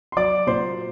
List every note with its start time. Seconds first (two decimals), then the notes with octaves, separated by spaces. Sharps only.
0.12 C6
0.17 F#3 D5 D6
0.47 A#2 C5 C6